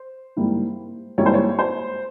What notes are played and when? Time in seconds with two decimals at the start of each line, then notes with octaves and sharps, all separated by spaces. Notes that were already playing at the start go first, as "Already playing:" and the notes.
Already playing: C5
0.37 G#2 G3 A#3 E4
1.18 G#2 G3 A#3 E4 C#5
1.26 C5
1.34 C#5
1.59 C5